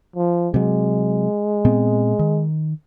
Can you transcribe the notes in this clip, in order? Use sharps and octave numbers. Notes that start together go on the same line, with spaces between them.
F3
C3 F#3 G#3
A#2 B3 C4
D#3